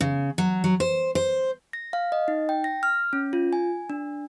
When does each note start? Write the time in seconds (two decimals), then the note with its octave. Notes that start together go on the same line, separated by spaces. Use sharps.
0.01 C#3
0.38 F#3
0.64 F#3
0.80 C5
1.15 C5
1.73 A#6
1.93 F5
2.12 D#5
2.28 D#4
2.49 G5
2.64 A#6
2.83 F6
3.13 C#4
3.33 F4
3.53 G#5
3.90 D4